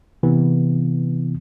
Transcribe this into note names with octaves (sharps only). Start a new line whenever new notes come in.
C3 E3 B3